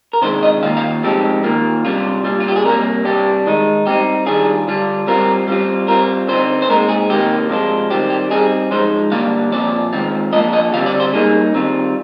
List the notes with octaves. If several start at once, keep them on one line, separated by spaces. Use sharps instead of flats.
A#4
C3 D#3 G#3 D4 F4 C5
D#5
D#3 A#3 F4 F5
F5
F3 G#3 C4 D#4 G4
D#3 A#3 F4
C3 G3 D4 F4
A#2 G3 D4 F4
F4
G4
G#4
C3 G3 A#3 A#4
C3 G3 D4 G4
D#3 G#3 D#4
G3 C4 D#4 G4
D#3 G3 D4 F4 G#4
D3 G3 D4 F4
G3 C4 F4 A#4
G3 C4 F4
G3 C4 F4 A#4
D3 G3 C4 D#4 C5
C5
A#2 G#3 C4 D#4 A#4
G#4
C3 D#3 A#3 G4
C3 F3 G#3 D4 F4
D#3 G3 C4 G4
G4
G3 C4 D#4 G#4
F3 G#3 D#4 C5
D3 G3 A#3 D4 F5
A#2 F3 C4 F4 D5
D#3 G#3 C4 F4
F3 A#3 D4 F4 D#5
D#5
D3 G3 C4 F5
D5
C5
G3 A#3 D#4 G#4
D#3 G3 C4 F4